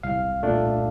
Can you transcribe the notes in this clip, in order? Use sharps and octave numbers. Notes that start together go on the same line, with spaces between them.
C2 F5
A#2 A3 D4